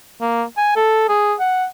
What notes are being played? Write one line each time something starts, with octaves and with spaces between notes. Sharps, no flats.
A#3
G#5
A4
G#4
F#5